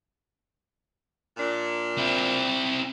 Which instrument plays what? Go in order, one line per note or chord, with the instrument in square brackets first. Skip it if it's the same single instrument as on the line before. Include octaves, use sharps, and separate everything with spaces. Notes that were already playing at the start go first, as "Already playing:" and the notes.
[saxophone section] A#2 D4
[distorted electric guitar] C4 E4